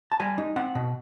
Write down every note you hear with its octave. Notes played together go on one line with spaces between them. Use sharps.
A5
G3 G#5
D#4
C4 F#5
B2